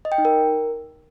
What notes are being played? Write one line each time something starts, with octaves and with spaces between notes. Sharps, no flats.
D#5
G5
D#4
A#4